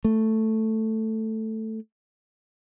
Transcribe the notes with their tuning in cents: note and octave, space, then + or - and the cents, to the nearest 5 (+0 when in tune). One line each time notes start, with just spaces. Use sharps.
A3 +5